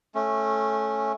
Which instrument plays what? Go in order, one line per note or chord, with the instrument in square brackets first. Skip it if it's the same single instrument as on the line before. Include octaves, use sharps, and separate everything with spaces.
[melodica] A3 C#4